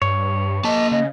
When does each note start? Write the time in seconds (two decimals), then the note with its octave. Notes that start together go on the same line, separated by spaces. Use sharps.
0.02 G2 C#5
0.64 A#3 D#5 A5
0.92 C#3 D#5